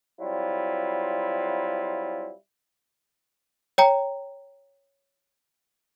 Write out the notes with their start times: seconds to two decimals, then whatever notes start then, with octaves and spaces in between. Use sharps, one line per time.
0.20 F#3 G3 C4 E4 F4
3.78 C#5 G5 A#5